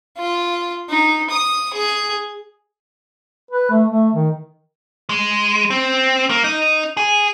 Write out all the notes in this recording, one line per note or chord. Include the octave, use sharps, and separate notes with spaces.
F4
D#4
D#6
G#4
B4
A3
A3
D#3
G#3
C4
A#3
D#4
G#4